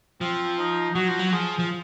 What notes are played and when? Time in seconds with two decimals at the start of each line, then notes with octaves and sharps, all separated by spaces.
0.21 F3 C4
0.58 D#4
0.95 F#3 F#4
1.08 F3
1.19 F#3
1.32 F3 G#4
1.59 F3